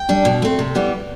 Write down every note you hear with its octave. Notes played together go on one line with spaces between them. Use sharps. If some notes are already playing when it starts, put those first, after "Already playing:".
Already playing: G5
G3 D4
B2
A3 C4
C3
E3 G3 B3